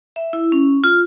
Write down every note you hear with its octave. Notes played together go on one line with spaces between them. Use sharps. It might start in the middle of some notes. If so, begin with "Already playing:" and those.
E5
E4
C#4
F4